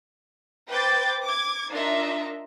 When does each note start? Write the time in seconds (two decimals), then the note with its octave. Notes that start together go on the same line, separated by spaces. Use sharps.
0.69 B4 C5 G5 D6 G6 A6
1.23 D6 G#6
1.70 D4 D#4 F4 A#4 D#5 E5